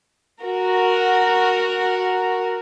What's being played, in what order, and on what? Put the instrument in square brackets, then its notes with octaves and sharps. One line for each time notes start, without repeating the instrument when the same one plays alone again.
[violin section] F#4 A#4